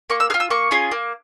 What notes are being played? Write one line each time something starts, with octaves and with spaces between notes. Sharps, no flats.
A#3 C#6
E6
G#4 F6
F4
E6
A#3 C#6
C#4 F4 G#4
A#3